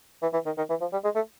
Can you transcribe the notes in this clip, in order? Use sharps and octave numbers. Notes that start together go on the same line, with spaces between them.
E3
E3
D#3
D#3
E3
F3
G3
G#3
A3